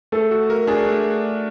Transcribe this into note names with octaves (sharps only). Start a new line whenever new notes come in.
A3 A4
F#4
A#4
D4 G#4
A3